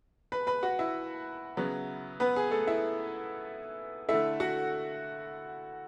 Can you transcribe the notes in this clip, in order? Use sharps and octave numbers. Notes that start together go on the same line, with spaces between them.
B4 B5
B4 B5
F#4 F#5
E4 E5
C#3 F#3 B3
B3 B4
G#4
A3 A4
E4 E5
D3 A3 E4 E5
F#4 F#5